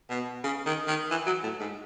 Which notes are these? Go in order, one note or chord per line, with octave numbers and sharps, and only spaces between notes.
B2
C#3
D#3
D#3
E3
F#3
A2
G#2